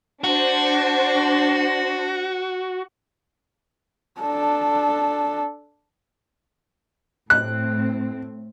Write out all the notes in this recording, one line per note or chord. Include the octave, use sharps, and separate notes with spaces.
D4 F#4 C5
D4 A4
A2 C4 F#6